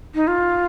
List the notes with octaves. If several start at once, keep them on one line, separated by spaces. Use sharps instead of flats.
D#4
F4